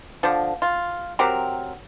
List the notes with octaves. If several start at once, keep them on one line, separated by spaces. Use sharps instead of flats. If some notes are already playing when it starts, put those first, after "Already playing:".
D3 F3
F4
F#3 C4 G4 A#4